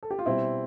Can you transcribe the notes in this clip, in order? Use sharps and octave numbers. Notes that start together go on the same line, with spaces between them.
A4
G4
F4
B2 G3 C4 E4